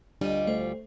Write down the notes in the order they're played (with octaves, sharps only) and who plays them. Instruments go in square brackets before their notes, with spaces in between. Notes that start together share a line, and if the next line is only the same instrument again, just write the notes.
[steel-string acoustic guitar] D2 G3 F4 [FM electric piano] D4 [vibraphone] D5 D#5
[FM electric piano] A3 [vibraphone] C5